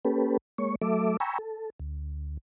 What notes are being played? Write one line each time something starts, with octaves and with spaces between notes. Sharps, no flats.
A#3 C#4 G4 A4 B4
G#3 A#3 C#5 C#6
F#3 A3 A4 E5 D6
G5 G#5 A#5 B5 C#6 E6
A4
D2